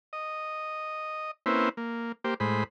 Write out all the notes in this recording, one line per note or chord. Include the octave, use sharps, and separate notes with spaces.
D#5
A#3 C4 C#4 E4 B4 C5
A#3
A#3 G4 C5
A2 G#3 C5 B5